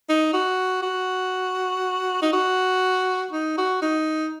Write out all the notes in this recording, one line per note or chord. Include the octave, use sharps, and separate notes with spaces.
D#4
F#4
F#4
D#4
F#4
D#4
F#4
D#4